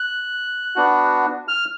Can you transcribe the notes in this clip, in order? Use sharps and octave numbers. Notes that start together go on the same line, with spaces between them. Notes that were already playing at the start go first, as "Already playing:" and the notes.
Already playing: F#6
B3 D4 F#4
F6